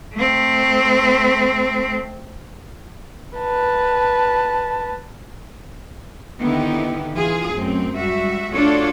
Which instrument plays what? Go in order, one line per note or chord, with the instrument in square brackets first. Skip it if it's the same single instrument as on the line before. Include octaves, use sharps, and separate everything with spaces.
[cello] A3 C4
[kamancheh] B4 A5
[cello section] D3 D#3 B3 D#4 E4 G4
E3 F4 G#4
F#2 A3 C4
G3 G#3 F#4 E5
A3 D4 F4 F#4 A4 C#5